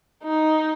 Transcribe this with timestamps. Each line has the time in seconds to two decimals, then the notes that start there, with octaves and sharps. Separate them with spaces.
0.23 D#4